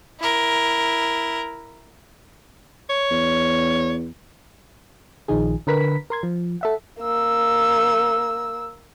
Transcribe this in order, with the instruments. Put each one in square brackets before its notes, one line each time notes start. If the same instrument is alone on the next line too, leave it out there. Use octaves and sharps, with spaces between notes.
[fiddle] E4 A#4
[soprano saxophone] C#5
[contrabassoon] E2
[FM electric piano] A#1 D#3 F3 D#4 G#4
D3 A#4 B4 B6
A#4 C6 G#6
F3
A4 E5 F#5
[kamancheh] A#3 E6